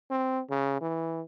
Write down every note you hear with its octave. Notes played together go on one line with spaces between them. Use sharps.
C4
C#3
E3